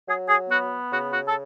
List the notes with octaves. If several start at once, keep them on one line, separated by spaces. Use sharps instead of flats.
F#3 G#4
G#4
B3 F#4
C#3 F#4
F#4
A4